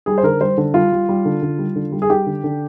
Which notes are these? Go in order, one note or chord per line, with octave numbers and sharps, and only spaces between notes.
G3 G#4
C5
D3 A#4
G3 C5
D3
G3 F4
G3
G3
D3
D3
G3
D3
G3
G#4
G3 G4
D3
D3